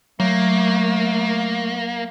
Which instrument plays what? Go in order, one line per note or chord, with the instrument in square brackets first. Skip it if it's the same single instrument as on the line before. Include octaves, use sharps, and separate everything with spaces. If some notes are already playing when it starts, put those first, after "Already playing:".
[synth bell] F#3 [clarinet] A3 [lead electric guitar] A#3